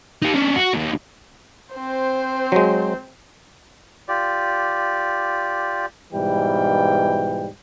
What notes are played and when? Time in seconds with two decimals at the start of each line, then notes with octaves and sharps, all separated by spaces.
0.22 D#4 G4
0.34 C#4 D4
0.56 F#4
0.74 D#2
1.75 C4 C5
2.52 F#3 G#3
4.08 F4 G4 D5
6.13 G#2 B2 E3 G3 G5